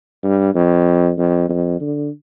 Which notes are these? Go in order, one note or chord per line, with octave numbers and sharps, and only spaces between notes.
G2
F2
F2
F2
D3